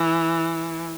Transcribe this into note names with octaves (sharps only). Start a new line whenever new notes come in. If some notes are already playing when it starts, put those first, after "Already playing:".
Already playing: E3